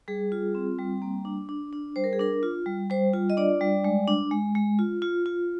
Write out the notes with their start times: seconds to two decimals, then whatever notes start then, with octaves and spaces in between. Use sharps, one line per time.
0.08 G3 G#4
0.32 F4
0.55 C4
0.78 G3
1.02 A#3
1.25 D4
1.49 D4
1.73 D4
1.96 G3 C5
2.04 A#4
2.13 G#4
2.19 D4 A#4
2.43 F4
2.66 G3
2.90 G3 C5
3.14 F4
3.30 D#5
3.37 D4 D5
3.61 G3
3.84 G#3
4.08 D4
4.31 G#3
4.55 G#3
4.79 F4
5.02 F4
5.26 F4